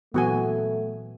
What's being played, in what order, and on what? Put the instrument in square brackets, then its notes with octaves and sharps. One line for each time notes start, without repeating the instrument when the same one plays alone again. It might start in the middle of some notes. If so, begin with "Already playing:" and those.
[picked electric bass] A#2 E3 F#3 [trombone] A3 [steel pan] B3 F#4 G#5